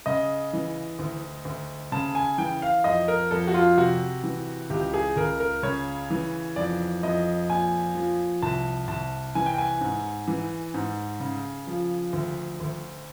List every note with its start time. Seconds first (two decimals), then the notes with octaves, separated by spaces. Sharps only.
0.06 C#3 D#5
0.53 E3
0.99 D2
1.45 D2
1.92 C#3 A5
2.15 G#5
2.38 E3 G5
2.62 F5
2.84 F2 D#5
3.08 A#4
3.31 F2 A4
3.47 F#4
3.54 F4
3.77 C3 F#4
4.24 E3
4.70 C#2 G4
4.94 G#4
5.16 C#2 A#4
5.40 A#4
5.63 C#3 C#5
6.10 E3
6.56 F2 D5
7.03 F2 D#5
7.48 A#2 G#5
7.95 F3
8.42 C2 A5
8.88 C2 A5
9.35 E3 G#5
9.46 G5
9.58 G#5
9.81 G#2
10.28 E3
10.74 G#2
11.20 C#3
11.67 F3
12.13 D2
12.60 D2